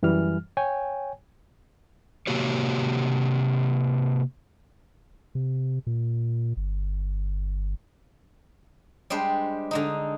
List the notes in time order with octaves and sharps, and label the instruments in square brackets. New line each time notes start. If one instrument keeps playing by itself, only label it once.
[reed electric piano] F#2 E3 G3 F6
C#5 G5 G#5
[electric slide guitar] C3 A#3 F#4 G4 C#5
[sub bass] C3
A#2
G1
[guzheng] G3 G#3 D4 G4 C5
D3 G#3 D#4